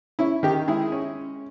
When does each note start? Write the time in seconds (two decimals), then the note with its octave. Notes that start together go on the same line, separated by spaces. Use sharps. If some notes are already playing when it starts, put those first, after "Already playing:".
0.19 C#4 E4
0.43 D#3 G4
0.68 G#3 E4 G#4
0.92 C#4